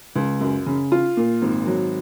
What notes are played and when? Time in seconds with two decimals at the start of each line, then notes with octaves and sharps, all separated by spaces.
0.16 C#2
0.41 F#2
0.66 C#3
0.92 F4
1.17 A#2
1.42 G#1
1.67 F#3